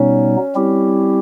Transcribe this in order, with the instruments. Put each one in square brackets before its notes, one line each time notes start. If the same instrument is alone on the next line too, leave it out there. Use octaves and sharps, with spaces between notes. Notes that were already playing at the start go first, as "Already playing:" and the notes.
Already playing: [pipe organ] B2 G3 B3 D#4 [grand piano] C#4
[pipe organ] G3 C4 E4 G4